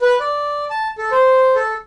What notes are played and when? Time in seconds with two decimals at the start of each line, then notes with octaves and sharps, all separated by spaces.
0.02 B4
0.20 D5
0.70 A5
0.98 A4
1.12 C5
1.56 A4